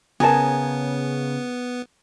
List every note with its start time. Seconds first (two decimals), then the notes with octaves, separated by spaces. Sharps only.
0.20 C#3 B3 G#4 A#4 G#5 A5